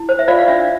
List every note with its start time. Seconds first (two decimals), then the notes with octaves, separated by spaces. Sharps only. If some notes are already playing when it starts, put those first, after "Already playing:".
Already playing: E4
0.09 C5
0.19 E5
0.28 F4 D5 F5
0.39 F5
0.48 D4 E5